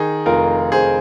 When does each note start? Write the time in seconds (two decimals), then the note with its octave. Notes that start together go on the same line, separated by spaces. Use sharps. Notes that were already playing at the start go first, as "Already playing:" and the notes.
Already playing: D#3 D#4 G#4
0.26 F1 F4 A#4
0.72 F1 G#4 C5